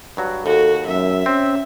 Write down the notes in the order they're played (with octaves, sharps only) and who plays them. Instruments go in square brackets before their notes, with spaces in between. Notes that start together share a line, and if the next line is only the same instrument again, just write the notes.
[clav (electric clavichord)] G2 F#3 F#4
[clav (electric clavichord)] D#2 [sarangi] F#4 [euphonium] A4
[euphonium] F#2 [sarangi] E5
[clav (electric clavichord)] C4 [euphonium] C#4